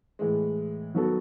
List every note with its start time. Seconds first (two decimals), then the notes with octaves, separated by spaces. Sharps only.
0.19 A2 E3 G#3
0.95 D#3 F#3 B3 F#4 A4